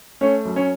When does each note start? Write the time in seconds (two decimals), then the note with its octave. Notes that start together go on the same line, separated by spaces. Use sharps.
0.21 A3 C#4 C#5
0.45 F#2
0.56 C#4 C#5